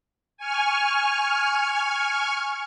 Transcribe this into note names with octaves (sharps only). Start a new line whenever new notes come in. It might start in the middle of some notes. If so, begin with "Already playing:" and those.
G#5 C#6 F6